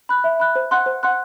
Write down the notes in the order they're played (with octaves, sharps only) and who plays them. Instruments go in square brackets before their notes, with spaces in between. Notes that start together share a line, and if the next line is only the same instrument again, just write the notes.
[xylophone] B5 F#6
E5
B5 F#6
C5
F#5 C6 F#6
C5
F#5 C6 F#6